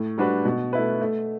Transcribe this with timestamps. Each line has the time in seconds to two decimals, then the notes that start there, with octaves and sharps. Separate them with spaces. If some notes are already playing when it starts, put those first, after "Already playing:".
Already playing: A2
0.18 G3 D4 F#4 B4
0.45 B2
0.73 A3 E4 B4
1.01 A3